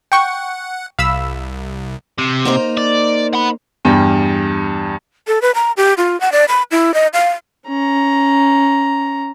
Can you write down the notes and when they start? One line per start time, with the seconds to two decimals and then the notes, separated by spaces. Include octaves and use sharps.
0.12 F#5 G5 C#6 C#7
0.99 C2 F5 B5 E6
2.18 C3
2.45 A#3 D#4 C5
2.77 D5
3.33 F#5 B5
3.85 E2 G2 G3 G5
5.27 A4
5.42 B4
5.55 A#5
5.77 G4
5.98 F4
6.21 F#5
6.32 D5
6.48 B5
6.71 E4
6.94 D#5
7.14 F5
7.67 C#4 A#5